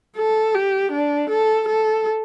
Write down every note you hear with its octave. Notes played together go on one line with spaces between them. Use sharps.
A4
G4
D4
A4
A4